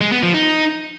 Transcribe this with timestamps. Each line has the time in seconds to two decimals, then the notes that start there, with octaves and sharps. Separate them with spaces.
0.01 G#3
0.12 B3
0.23 F3
0.34 D#4